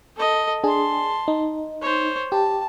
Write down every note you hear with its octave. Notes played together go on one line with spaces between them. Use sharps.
A4 D#5
D4 G#4 A5 C6
D#4
C5 C#5
G4 A5